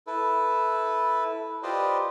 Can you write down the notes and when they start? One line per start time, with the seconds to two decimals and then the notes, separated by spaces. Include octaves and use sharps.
0.07 E4 A4 B4
1.63 F4 G4 B4 C5 D5 D#5